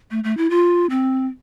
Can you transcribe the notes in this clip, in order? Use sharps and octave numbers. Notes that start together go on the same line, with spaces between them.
A3
A3
E4
F4
C4